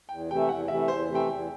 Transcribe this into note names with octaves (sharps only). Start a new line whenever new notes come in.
E2 G5
C3 E3 A3 G5
E2 F#5
C3 E3 A3 E5
E2 C5
C3 E3 A3
G5
E2